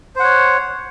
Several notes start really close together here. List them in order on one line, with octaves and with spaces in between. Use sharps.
C5 F#5 C#5